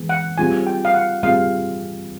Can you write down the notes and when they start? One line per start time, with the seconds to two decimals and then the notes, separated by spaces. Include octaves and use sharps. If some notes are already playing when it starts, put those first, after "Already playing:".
Already playing: E3 G#3 B3
0.09 F#5
0.38 G3 C4 F4 G#4 G#5
0.67 G5
0.85 F5
0.94 F#5
1.23 G3 C4 F4 G#4 F5